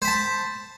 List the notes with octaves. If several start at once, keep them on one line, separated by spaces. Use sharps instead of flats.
C5 A5 B5